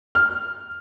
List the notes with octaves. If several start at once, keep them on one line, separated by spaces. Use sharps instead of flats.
F6